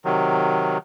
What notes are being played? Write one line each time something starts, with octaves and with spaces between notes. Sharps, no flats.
C3 D#3 F#3